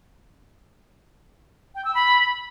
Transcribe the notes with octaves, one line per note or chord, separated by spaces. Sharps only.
G5
E6
B5